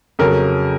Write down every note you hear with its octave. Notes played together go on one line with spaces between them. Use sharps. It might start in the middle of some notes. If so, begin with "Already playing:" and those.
F2 C#3 F#3 A#4